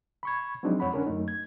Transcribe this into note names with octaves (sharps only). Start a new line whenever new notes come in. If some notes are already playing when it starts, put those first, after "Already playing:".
B5 C#6 G#6
F3 F#3 G#3 C4 D4 D#4
F2 C#5 F#5 B5
D3 C#4 D4 A#4
F#2 A3 D#4
G#6